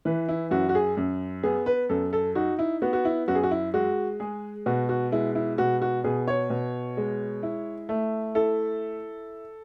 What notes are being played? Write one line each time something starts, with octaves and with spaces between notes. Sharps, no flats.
E3 B4
E4
F#2 F#4
F#4
G#4
F#2
B3 G#4
B4
F#2 A4
A4
D#4 F#4
E4
B3 F#4
F#4
E4
F#2 F#4
G#4
F#4
E4
G#3 F#4
G#3 G#4
B2 F#4
F#4
G#3 E4
E4
B2 F#4
F#4
B2 G#4
C#5
B2
G#3
E4
A3
E4 A4